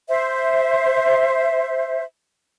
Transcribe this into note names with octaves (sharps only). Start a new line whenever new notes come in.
C5 E5